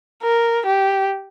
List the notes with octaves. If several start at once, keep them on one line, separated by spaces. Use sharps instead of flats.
A#4
G4